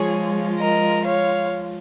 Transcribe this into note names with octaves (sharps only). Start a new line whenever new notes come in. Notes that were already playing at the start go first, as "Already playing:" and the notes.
Already playing: F3 G#3 F4 G#4 C#5
A#4 D#5
C#5 F5